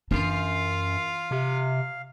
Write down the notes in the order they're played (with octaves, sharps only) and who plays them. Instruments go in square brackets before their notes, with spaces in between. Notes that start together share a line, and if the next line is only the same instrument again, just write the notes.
[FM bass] F#2 [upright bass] E3 D4 [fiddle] F4 [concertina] F5
[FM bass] C3